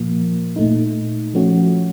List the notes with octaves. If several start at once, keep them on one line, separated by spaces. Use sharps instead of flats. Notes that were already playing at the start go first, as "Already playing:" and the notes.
Already playing: A#2 F3 A#3
A#2 A3 D#4
F3 A3 C#4 F#4